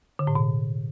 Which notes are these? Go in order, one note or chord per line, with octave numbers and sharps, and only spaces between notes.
D3
A2
B2